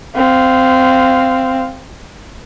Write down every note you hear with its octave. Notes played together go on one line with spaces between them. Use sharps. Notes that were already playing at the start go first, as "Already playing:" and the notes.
C4 F5